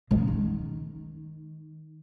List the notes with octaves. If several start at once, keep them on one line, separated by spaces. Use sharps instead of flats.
C#3
D#3